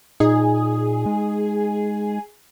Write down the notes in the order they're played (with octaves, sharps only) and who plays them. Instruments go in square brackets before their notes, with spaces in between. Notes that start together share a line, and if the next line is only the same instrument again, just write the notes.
[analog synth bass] A#2 [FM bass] D#4 [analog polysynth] G#4
[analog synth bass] G#3